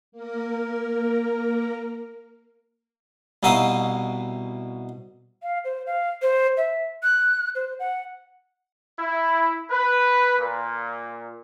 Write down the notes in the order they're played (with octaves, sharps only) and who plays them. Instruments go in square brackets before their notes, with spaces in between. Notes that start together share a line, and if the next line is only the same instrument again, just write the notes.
[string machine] A#3 A#4
[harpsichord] C2 B2 D#4 E5 F5 D#6
[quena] F5
C5
F5
C5
E5
F#6
C5
F#5
[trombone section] E4
B4
A#2